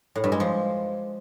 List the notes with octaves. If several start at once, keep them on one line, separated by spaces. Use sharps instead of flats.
A2
G2
G#3
F3